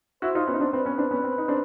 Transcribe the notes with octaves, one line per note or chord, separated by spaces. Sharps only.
E4 F#4 C5
D#4 F4
B3 C#4
D#4
C4 D4
C4 B4
B3 C#4
C4 D4
B3 C#4
C4
D#4
C4 D4